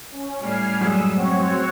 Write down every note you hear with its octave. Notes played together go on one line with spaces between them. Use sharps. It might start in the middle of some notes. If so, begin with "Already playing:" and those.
C#4
A2 G3 A3 G#5 F6 C7
F#2 G#3 D#6 E6
C4 F#4 C#5